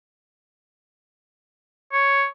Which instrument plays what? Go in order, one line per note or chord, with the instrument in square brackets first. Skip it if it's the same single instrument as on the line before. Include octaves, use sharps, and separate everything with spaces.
[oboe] C#5